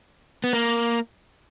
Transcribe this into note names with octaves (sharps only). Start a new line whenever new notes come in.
B3
A#3